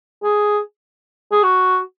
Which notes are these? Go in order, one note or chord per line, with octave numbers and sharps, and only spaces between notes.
G#4
G#4
F#4